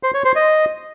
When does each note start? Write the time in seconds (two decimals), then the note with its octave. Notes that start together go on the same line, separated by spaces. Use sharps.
0.03 C5
0.14 C#5
0.25 C5
0.36 D#5